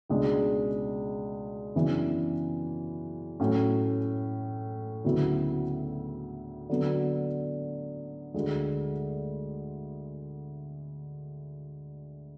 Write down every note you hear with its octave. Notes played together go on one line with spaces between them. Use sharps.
C#2 B2 G#3 D4
F#2 C#3 E3 B3 D4
A2 F#3 C#4
D2 C#3 F#3 B3 E4
D3 F#3 B3
D2 D3 G#3